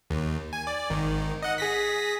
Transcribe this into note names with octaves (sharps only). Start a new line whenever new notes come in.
D#2
G#5
D5
G#1 D#3
D#5 F#5
G#4 A#6 B6